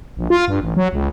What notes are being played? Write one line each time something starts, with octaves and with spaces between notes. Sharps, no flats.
A#1
F4
G2
A1
F#3
C#2